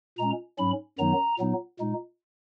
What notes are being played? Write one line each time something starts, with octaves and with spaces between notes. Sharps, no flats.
A#2 G#3 C#4 A#5
G#2 F#3 C#4 B5
F#2 D#3 F#3 B3 D#4 A#5
A#2 F#3 B3 D#4
A#2 G#3 D#4